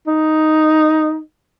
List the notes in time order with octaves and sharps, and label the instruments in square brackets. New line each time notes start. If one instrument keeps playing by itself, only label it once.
[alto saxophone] D#4